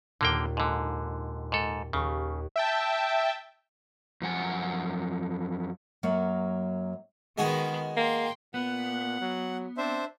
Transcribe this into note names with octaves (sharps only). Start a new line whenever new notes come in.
D#2 A#2 D3 A#3 G5
G#2 D3
G#2 A4
D#2 C#3 G4 C#6
E5 G5 A5
F#2 F3 F#5 G#5
F#2 F#3 A#3 C#5
D#3 G#3 B3 F#4 G#4
A#3 G5 C6
A#2 B3 F#5
F#3
C4 D4 C5 E5